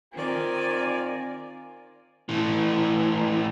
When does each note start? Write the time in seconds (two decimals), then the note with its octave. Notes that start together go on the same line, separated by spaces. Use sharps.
0.14 D#3 C4 F4 A#4 D5 G#5
2.29 A2 E3